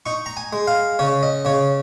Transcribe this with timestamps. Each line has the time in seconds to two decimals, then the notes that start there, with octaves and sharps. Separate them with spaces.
0.06 D#4 C#6
0.26 A#5
0.37 G#5
0.53 G#3
0.67 F5
0.99 C#3 C#5
1.23 D#5
1.45 C#3 C#5